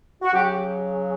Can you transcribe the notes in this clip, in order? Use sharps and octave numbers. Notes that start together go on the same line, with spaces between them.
F#4
C#3 F#3 G4